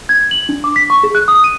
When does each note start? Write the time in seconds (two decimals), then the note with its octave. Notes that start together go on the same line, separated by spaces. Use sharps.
0.09 G#6
0.31 F#7
0.49 D4
0.64 D6
0.76 B6
0.90 C#6
1.03 G#4
1.15 F#6
1.28 D#6
1.44 D#7